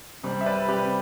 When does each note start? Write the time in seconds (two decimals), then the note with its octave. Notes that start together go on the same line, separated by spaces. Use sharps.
0.23 C3 G3 C4
0.41 E5
0.46 B4 D5
0.68 C3 G3 C4 G4 B4